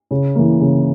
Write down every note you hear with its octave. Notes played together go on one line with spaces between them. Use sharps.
C#3
E3 A#3
C#3